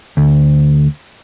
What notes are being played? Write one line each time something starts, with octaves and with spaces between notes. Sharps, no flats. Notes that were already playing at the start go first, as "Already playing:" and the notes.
D2